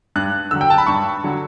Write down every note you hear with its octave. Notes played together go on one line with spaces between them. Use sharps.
G2 F#6
D3 F#3 E6
G5
A5
B5
G2 C#6
D3 F#3